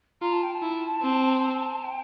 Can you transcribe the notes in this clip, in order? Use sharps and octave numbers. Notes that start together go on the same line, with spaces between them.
F4 A#5
A5
G5
A5
E4
C4
G5